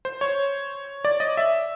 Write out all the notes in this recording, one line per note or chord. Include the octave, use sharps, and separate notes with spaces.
C5
C#5
D5
D#5
E5